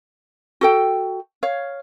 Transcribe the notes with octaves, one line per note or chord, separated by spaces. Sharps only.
F#4 A4 G5
C#5 F5